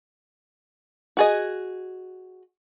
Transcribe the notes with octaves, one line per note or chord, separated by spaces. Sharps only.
F#4 G#4 D#5